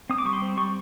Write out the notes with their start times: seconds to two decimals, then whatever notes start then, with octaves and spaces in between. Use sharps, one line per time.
0.10 C4 D#6
0.18 D6
0.25 G3 C#6
0.33 C6
0.42 C4
0.57 G3 C#6